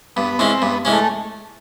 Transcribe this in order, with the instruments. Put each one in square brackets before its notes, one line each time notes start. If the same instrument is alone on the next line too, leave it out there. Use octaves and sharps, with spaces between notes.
[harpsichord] G2 [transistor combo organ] B3
[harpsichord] E3 G#3 C#4 [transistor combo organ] C4
[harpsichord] G2 [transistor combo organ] B3
[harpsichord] E3 G#3 C#4
[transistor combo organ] A3